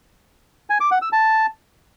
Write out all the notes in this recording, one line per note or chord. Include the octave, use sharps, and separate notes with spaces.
G#5
D6
F#5
E6
A5